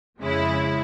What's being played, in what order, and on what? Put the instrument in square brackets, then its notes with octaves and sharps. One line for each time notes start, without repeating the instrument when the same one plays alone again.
[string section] F2 C#3 G#3 E4